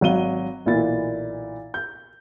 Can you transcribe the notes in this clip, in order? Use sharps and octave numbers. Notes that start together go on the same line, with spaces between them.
G#1 F#3 F5 D#7 G7
B1 A#2 E3 E4 A6
G6